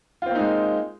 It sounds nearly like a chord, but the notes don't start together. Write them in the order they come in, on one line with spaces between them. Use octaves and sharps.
F4 C4 A#3 D#4 G#3